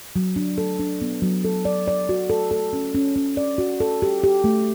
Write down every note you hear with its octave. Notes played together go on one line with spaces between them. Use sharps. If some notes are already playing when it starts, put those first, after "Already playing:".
F#3
D4
A4
D4
B3
F#3
A4
D5
D5
F#4
A4
A4
C#4
C#4
C#4
D5
F#4
A4
G4
G4
A3